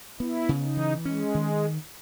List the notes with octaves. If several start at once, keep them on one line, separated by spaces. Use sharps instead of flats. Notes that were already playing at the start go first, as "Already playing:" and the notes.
B3 E4
C#3
D#4
E3
G#3 C#4
D#3